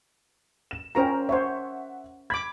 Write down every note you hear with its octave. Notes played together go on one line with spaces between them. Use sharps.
E7
C#4 F4 A#4 C5 G5 A#5
C5 C#5 E5 F#5
B5 D6 G#6